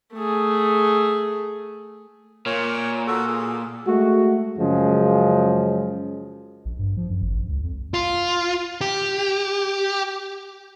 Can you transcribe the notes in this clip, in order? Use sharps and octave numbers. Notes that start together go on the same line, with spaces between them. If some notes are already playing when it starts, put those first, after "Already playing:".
A3 G#4
A#2 A#4 C#5
F#4 A4
G#4 A4
G#3 A3 F#4
F#2 C#3 F3 G#3
A#1
G2
F3
F#2
G#1
A#1
C#2
F2
F4
G4